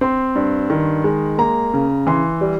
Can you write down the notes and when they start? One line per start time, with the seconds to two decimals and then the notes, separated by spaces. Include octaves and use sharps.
0.01 C4 C6
0.35 G2
0.70 D#3
1.04 G#3
1.38 A#3 A#5
1.73 C#3
2.07 E3 C6
2.41 G3